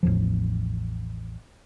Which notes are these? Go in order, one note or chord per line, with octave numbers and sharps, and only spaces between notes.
A1 E2 F3